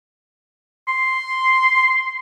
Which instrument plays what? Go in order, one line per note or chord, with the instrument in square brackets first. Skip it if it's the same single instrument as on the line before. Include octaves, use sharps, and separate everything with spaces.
[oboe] C6